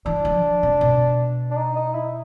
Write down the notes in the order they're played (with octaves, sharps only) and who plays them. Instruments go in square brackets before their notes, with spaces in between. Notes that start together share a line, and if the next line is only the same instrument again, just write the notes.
[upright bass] E3 [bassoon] D4
[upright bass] F3
C3
B2
[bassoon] D4
D#4
D#4
E4